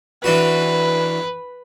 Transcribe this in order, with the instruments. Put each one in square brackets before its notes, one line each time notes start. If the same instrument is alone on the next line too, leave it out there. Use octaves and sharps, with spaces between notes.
[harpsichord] E3 D4 F#4 [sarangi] B4